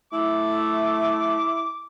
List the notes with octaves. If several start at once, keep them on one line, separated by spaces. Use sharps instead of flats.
A3 E4 D6